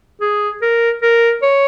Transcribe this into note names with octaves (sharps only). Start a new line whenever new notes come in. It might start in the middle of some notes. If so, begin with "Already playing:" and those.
G#4
A#4
A#4
C#5